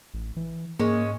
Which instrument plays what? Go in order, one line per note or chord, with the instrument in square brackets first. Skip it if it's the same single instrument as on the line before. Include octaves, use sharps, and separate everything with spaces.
[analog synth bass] A1
E3
[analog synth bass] G#2 [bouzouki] G#3 C#4 [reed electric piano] A#3